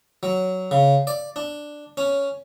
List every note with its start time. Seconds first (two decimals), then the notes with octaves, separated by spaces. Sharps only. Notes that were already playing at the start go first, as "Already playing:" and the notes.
0.23 F#3
0.71 C#3
1.07 D5
1.36 D4
1.97 C#4